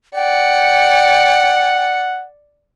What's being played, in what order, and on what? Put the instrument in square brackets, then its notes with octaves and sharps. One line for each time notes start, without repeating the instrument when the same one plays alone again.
[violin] D5 C#7 [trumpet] F#5 [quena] G5